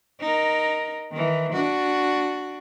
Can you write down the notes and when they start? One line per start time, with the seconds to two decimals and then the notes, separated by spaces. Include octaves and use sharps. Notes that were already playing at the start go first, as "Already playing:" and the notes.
0.21 D#4 A#4
1.12 D#3 E3
1.52 D4 F#4